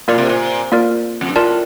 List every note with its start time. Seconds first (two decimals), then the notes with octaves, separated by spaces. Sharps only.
0.08 A#2 A#3 F4 A#4 D5
0.18 C3
0.29 A#2
0.72 A#3 F4 A#4 D5
1.21 F2
1.29 G2
1.36 A2 F4 A#4 D5 A5